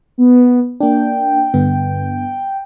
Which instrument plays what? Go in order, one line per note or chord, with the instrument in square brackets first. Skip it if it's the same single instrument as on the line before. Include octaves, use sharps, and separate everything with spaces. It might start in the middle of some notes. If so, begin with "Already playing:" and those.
[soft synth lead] B3
[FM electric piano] A#3 D4 [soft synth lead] G5
[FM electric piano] G2 D3 B3